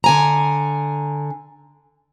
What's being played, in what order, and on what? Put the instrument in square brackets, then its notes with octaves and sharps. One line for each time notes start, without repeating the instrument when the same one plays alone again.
[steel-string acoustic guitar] D3 G#5 A#5